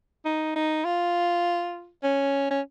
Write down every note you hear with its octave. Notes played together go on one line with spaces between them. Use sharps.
D#4
D#4
F4
C#4
C#4